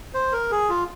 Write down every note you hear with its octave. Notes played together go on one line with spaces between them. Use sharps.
C5
A#4
G#4
F4